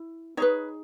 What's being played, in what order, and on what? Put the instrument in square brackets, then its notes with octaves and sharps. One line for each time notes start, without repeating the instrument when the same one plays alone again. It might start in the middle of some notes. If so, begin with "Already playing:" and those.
Already playing: [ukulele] E4
D#4 G#4 B4 C#5